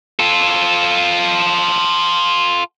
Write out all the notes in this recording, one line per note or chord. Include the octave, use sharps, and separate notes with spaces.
F4 A4